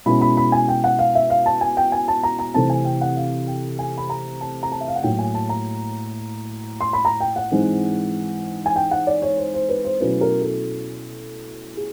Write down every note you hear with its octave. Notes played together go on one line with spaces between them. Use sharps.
B2 G#3 C#4 E4 B5
B5
B5
G#5
G5
F#5
F5
E5
F5
A5
G#5
G5
G#5
A5
A#5
A#5
C3 E3 A3 C4 A5
G#5
G5
F#5
F5
G5
G#5
B5
A#5
A5
A#5
A5
E5
F5
F#5
A2 F#3 A#3 G5
G#5
A5
A#5
C6
B5
A#5
G5
F#5
G#2 E3 G#3 C4
G#5
G5
F#5
D5
C#5
C5
C5
B4
C5
B2 F#3 A3 C#4 E4 B4
A#4
A4
G#4